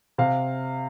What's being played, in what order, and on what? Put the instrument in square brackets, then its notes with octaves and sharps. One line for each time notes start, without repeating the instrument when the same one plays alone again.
[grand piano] C3 F5